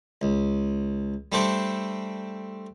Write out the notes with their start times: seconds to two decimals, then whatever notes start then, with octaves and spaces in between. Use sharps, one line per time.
0.21 C#2
1.32 G3 A3 C4 D4 A4 C5